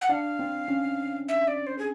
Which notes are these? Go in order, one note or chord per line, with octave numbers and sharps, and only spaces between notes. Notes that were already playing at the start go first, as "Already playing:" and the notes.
F#5
D4 F5
C4
C#4
E5
D5
C5
G#4